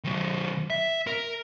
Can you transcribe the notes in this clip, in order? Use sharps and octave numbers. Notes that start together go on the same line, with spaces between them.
D#3 F#3
E5
A#4